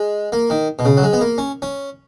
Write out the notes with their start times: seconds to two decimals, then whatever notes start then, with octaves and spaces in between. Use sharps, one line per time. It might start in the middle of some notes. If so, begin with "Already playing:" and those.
Already playing: G#3
0.32 A#3
0.50 D#3
0.79 B2
0.85 C#3
0.97 F#3
1.03 G#3
1.13 B3
1.21 A#3
1.38 C#4
1.62 C#4